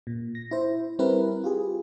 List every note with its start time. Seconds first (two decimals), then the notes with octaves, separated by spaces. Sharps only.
0.07 A#2
0.35 A#6
0.51 E4 C5
0.99 G3 C4 E4 A#4 B4
1.44 F4 G4 G#4